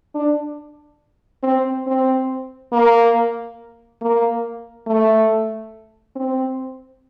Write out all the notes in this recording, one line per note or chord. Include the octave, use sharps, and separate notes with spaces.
D4
C4
C4
A#3
A#3
A3
C4